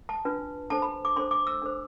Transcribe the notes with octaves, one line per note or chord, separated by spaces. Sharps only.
A5
D4 F4 B4
D4 A4 C5 A5
B5
D6
D4 A4 C5 C6
D6
E6
D4 A4 C5